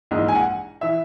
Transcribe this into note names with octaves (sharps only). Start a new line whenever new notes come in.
A#1 G#2 E3 D#5
G#5
F#5
E3 E5